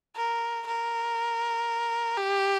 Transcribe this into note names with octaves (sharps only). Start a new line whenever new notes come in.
A#4
A#4
G4